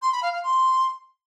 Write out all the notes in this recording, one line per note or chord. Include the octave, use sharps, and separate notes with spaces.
C6
B5
F5
F5
C6